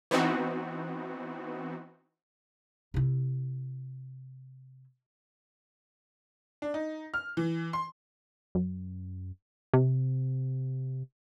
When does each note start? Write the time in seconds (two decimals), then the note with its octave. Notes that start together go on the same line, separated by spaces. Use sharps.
0.11 E3 B3 C4 D#4 F#4
2.94 C3 E4
6.62 D4
6.74 D#4
7.14 F6
7.37 E3
7.73 C6
8.55 F#2
9.74 C3